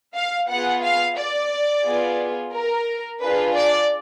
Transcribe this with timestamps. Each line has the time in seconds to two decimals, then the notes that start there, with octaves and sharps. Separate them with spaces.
0.15 F5
0.49 B3 F4 G#4 F#5
0.83 F5
1.17 D5
1.85 B3 F4 G#4
2.53 A#4
3.20 D4 F4 G#4 B4
3.55 D5